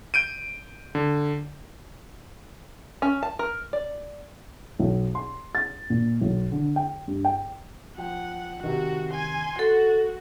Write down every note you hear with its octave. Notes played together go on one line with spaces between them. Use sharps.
G6 D7 D#7
D3
C#4
A5
A#4
D5
B1
C6
A6
A#2
B1
D3
G5
G2
G5
F3 F#5 G5
C3 D#3 F#4
G#5 C6
F#4 A4 F#5